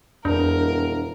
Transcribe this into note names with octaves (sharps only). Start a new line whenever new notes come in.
E1 F2 D4 A#4